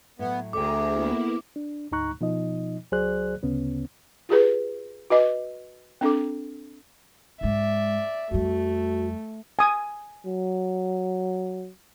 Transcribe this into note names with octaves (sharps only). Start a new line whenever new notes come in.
A2 F#3 B3
D2 G#4 A4 E5 G5 A#5 D6
A#3 B3 E4
D4
D2 G#2 D#4 A#5 C#6 F#6
B2 F3 D#4 D#5
C#2 F#3 G#4 C5 D5 F#6
D2 C#3 B3 C#4
F4 G4 G#4 B4
F#4 B4 D#5 D6
C4 D4 A4 D6
G#2 G#3 D5 E5
F2 G3 A3 F#4
G#5 D#6
F#3